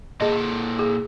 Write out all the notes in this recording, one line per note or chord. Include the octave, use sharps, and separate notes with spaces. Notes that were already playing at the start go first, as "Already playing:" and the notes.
A#2 G#4 A4 D#5
G#4